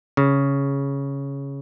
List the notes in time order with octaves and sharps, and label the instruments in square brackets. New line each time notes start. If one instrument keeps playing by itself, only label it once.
[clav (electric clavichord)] C#3